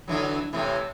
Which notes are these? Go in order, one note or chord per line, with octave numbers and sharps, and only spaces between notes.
D3 E3 F#3
A2 C3 E3